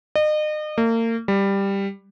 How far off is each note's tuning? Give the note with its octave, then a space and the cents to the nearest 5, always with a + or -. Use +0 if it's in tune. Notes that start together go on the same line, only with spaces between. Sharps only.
D#5 -35
A#3 -35
G3 +10